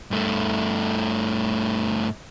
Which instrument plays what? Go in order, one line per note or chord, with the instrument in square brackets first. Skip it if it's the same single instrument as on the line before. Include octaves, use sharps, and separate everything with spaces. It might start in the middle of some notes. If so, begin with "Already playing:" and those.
[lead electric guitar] G2 A3